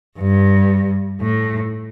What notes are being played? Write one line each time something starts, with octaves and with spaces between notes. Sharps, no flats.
G2
A2